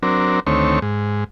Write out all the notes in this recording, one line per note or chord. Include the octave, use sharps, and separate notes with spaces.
F#3 C4 D4 A#4
D2 D#3 A3 C4 C#5
G#2